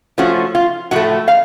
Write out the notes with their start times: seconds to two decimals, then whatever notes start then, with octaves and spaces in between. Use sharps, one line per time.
0.18 F3 A3 C#4 F4 F#4
0.55 F4
0.91 A2 F3 A3 F#4
1.28 F5